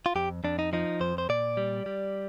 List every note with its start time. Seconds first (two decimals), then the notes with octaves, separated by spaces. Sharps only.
0.06 F4
0.15 F2 G4
0.44 F2 D4
0.59 D#4
0.73 F3 D#4
1.00 F2 C5
1.18 C5
1.29 A#2 D5
1.57 G3
1.86 G3